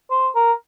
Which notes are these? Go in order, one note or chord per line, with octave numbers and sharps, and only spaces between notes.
C5
A#4